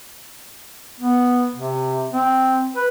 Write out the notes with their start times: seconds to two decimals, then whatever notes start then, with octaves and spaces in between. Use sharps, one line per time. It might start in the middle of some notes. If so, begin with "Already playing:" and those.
1.00 B3
1.55 C3
2.13 C4
2.76 B4